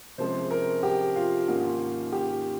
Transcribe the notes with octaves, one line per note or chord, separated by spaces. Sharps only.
C3 F3 G#3 C#4 C5
A#4
G4
F4
G#2 D#3 A#3 C#4
G4